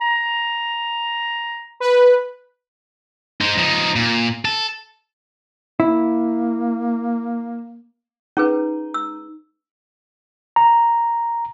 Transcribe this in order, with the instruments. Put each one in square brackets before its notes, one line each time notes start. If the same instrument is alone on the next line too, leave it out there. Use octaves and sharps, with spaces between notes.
[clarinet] A#5
[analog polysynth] B4
[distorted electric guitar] D#4 C5
F3 D#4
A#2
A4
[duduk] A#3 [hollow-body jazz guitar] E4
[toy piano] C#4 G#4 B4 [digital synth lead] D#4
[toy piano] E6
[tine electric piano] A#5